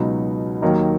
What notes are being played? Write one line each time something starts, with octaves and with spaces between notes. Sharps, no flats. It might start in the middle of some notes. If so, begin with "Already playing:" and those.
Already playing: C#2 B2 F#3 B3 D#4
D#2 D#3 F#3 A#3 D#4